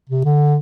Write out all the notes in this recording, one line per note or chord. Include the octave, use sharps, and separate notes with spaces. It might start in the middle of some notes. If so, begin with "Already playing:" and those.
C3
D3